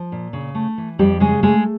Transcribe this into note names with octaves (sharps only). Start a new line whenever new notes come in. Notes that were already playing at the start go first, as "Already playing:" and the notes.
Already playing: F3
A#2
C#3
A3
E3
F2 G3 G4
C#3 G#3 G#4
G#3 A3 G#4